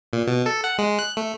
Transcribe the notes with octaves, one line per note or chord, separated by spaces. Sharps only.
A#2
B2
A4
F#5
G#3
F#6
A3